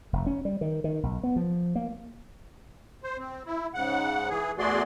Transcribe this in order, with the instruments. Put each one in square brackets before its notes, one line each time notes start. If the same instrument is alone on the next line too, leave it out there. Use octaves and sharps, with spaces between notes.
[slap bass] F1
C#4
G3
D#3
D#3
B1
B3
F3
A#3
[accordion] C5
C4
E4
G#2 C#3 F#5
E3 G#4
E2 A3 F#4 G#4 D5 C6